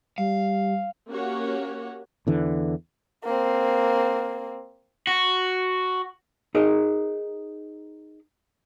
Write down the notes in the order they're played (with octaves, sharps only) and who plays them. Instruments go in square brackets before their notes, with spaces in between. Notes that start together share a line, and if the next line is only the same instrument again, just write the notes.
[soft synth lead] G3 [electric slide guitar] F5
[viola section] A#3 C#4 F#4 G4 C#5 F#5
[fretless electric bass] E2 D3 E3
[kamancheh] A#3 C4
[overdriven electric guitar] F#4
[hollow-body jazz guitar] D#4 G#4 A#4 D#5